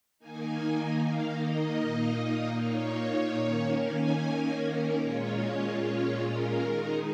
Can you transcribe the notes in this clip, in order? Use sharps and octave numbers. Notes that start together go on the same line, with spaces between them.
D#3 A#3 D#4 G#5
F5
D#5
A#2 A#3 D#4
C#5
D#3 A#3 C#4
G#5
A#4
A#2 G#3 C#4 F4 C#5
C#5
C#5
A#4
D#3 G#3 D#4